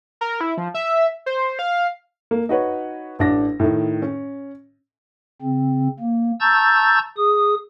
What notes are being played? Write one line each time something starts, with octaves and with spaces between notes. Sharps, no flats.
A#4
E4
F3
E5
C5
F5
A#3
D#4 F#4 B4 C#5
A1 D4 A#6
A2 D#3
C#4
C#3 C4
A#3
A5 A#5 C#6 E6 G6 A6
G#4 D#6